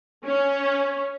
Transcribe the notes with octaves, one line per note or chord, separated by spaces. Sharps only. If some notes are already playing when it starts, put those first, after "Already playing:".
C#4